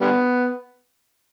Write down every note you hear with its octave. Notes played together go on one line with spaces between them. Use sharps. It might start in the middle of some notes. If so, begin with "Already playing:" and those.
D3 G3 B3